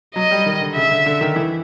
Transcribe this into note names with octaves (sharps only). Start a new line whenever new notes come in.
F#3 D#5
G3
D#3
D3
C#3 E5
D3
D3
D#3
E3